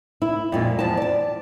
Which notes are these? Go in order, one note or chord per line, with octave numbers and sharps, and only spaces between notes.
E4
F2 A#2 G#3
E2 F3 A5
D5 A5